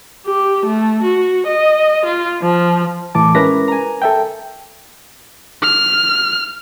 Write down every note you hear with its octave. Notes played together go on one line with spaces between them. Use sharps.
G4
A3
F#4
D#5
F4
F3
A2 E3 A5 D6
G#3 C#4 E4 A#4 B4 A#6
G#5 A#5
A4 E5 G5
F6